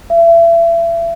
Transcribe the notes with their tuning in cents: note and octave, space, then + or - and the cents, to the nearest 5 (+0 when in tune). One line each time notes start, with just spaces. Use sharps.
E5 +35